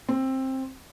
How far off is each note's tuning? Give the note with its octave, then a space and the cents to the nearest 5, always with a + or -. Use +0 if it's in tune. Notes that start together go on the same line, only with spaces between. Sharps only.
C4 +15